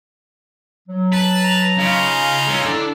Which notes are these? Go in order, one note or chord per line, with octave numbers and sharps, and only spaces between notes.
F#3
B4 A5
A#5
C#3 D#4 F4
G#3 C#4 E6
D3 D4 E4 A4